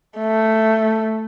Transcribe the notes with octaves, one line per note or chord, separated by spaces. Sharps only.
A3